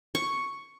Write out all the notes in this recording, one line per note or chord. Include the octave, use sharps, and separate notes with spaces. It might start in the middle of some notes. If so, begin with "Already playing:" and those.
C#6